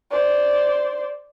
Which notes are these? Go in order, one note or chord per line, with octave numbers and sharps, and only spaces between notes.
C5 D5